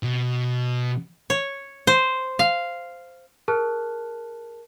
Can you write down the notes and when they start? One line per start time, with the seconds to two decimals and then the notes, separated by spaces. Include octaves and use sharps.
0.03 B2
1.30 C#5
1.87 C5
2.39 F5
3.48 G#4 A#4 A5 F6 F#6